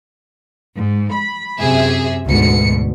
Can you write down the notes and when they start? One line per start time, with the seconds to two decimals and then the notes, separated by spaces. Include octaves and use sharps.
0.77 G#2
1.13 B5
1.59 F#2 C3 G#4 E5
2.26 D2 G#2 B2 C#7